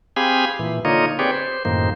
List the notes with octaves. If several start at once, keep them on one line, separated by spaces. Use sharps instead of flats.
C4 G4 G#4 F5 G#5 B5
A#2 E3
D3 A#3 D#4 F4 C#5 D#5
C4 G4 G#4 B4 C#5 D5
C5
F#2 A2 D#3 A#3 C5